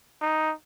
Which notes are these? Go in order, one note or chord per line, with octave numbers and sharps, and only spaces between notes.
D#4